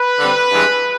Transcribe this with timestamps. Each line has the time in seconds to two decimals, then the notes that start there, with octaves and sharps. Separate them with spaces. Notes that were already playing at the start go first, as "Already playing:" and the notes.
Already playing: B4
0.19 D3 G3 C4
0.52 G2 E3 G#3